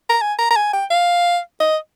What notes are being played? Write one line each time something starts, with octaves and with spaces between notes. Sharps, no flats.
A#5
G#5
A#5
A#5
G#5
G5
F5
D#5